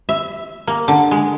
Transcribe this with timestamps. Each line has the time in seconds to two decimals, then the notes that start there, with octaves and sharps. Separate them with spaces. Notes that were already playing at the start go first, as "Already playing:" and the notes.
0.09 E5
0.67 A#3
0.88 D3
1.11 G#3